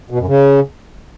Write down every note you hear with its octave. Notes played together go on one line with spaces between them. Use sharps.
B2
F#2
C#3